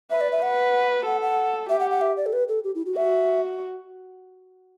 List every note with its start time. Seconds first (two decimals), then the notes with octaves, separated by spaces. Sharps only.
0.10 B4 E5
0.21 D5
0.32 E5
0.42 B4 F#5
1.06 A4 F#5
1.22 F#5
1.69 G4 E5
1.80 F#5
1.90 F#5
2.01 E5
2.17 D5
2.26 A4
2.33 B4
2.49 A4
2.64 G4
2.75 E4
2.86 F#4
2.96 F#4 E5